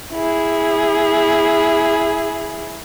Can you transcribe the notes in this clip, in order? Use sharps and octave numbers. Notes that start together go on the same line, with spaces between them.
E4 G#4